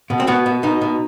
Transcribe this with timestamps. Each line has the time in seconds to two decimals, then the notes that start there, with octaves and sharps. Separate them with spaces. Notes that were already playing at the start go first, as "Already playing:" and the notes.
0.10 B2
0.20 C4
0.27 B2 B3
0.46 B2
0.63 B2 D#4
0.82 B2